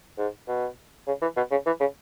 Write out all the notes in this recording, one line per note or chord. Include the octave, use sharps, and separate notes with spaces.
G#2
B2
C#3
E3
B2
C#3
E3
C#3